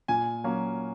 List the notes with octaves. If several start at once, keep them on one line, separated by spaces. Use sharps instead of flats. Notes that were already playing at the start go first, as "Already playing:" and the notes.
A#2 G#5
F#3 A#3 C#4